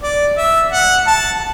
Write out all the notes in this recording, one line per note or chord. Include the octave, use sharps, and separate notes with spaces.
D5
E5
F#5
A5